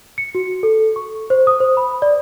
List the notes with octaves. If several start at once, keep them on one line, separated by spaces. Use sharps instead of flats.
C#7
F#4
A4
C#6
C5
D#6
C5
B5
D5